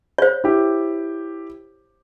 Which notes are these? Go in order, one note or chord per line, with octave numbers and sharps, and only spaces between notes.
C5 C#5
E4 G4